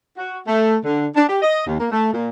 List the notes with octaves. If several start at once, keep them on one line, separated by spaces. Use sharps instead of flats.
F#4
A3
D3
D4
G4
D#5
D#2
A#3
A3
A#2